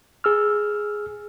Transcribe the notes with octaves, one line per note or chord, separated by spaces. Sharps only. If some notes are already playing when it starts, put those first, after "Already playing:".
G#4 E6 F6